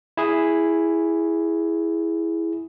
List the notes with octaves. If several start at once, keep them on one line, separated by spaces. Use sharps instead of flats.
E4 G#4